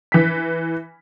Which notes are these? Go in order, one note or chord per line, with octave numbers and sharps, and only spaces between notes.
E3 B6